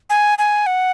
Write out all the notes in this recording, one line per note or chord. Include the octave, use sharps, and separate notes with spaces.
G#5
G#5
F#5